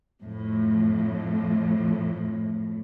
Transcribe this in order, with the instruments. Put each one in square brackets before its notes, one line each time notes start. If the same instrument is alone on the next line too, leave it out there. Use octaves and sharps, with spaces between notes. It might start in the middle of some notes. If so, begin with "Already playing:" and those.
[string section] F2 A2